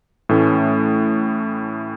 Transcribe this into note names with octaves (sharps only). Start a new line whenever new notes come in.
A2 E3 A3 C#4